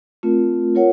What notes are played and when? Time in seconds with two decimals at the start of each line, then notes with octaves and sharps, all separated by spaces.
0.23 A3 C4 F4 A#4
0.75 F4 A#4 C#5 F#5